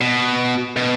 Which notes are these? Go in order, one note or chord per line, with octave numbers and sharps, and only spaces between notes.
B2
B2